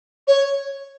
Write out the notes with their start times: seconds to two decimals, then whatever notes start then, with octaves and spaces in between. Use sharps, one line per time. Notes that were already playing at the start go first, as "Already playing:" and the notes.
0.27 C#5